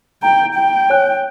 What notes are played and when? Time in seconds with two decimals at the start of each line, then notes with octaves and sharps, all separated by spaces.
0.23 G5 A#5
0.55 G5
0.90 C#5 G#5 F#6